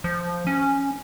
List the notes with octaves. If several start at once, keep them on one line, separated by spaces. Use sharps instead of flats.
F3
C#4